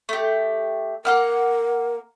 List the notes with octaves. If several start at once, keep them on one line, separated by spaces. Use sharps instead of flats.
A3 G4
A#3 A#4 F#5 F6